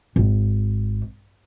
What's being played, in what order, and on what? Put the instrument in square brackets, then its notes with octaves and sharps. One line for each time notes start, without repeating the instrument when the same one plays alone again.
[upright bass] G#1